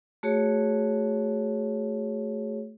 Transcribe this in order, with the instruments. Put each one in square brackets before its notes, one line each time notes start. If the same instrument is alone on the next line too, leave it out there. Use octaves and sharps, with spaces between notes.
[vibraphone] A3 F#4 G#4 C#5